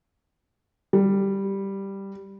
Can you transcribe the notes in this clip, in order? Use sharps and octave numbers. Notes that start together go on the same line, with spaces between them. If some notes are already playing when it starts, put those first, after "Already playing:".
G3